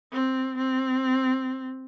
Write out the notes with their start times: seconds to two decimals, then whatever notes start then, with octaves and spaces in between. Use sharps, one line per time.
0.12 C4
0.58 C4